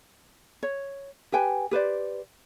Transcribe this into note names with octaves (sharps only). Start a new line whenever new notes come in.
C#5
G4 B4 G5 G#5
G4 B4 C5 D5